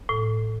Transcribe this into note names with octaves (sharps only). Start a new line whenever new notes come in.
A2